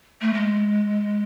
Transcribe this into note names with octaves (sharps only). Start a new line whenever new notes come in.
A3
G#3